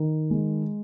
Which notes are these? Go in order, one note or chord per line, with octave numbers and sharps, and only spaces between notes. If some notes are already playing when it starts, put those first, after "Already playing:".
Already playing: D#3
G#3